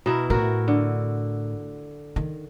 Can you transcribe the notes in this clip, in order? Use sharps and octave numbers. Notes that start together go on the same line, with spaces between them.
B2 E4 A#4
A2 E4 F#4 A#4
D3
D#3